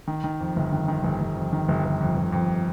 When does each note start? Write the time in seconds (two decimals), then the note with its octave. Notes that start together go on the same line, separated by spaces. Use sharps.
0.07 D#3
0.24 D#3
0.41 F2
0.56 G1
0.72 D#3
0.88 D#3
1.04 G1
1.20 G1
1.37 F2
1.53 D#3
1.68 G1
1.85 G1
2.01 F2
2.16 G1
2.32 F2